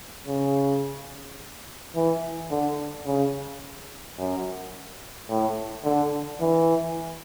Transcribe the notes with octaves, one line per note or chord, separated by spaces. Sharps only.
C#3
E3
D3
C#3
F#2
A2
D3
E3